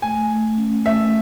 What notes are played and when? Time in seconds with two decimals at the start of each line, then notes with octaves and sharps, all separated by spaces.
0.02 A3 G#5
0.30 A3
0.57 C#4
0.85 A3 E5